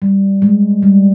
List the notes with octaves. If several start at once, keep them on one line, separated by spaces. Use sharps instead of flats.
G3
G#3
G3